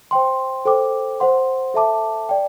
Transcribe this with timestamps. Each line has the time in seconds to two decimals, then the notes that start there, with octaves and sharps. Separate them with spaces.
0.11 C5 G5 C6
0.65 A4 C5 G5 D6
1.20 C5 F#5 C6
1.74 A4 E5 A5 D6
2.29 D5 G5